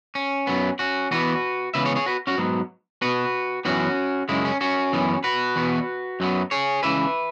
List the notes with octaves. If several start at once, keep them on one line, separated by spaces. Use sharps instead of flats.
C#4
F#2 F#3 B3
C#4 F#4
E2 E3 B3 F#4 B4
C#2 C#3 E3 B3 B4 E5
G#4 C#5
G#4 C#5
F#4 B4
C#4 F#4
G#2 F#3 B3
B2 B3 F#4 B4
F#2 E3 B3 C#4 F#4
F#2 C#3 G#3 E4
C#4
C#4 F#4
F#2 E3 B3
F#4 B4
E2 B2 B3
F#2 F#3 B3
G#4 C#5
C#2 C#3 E3 B4 E5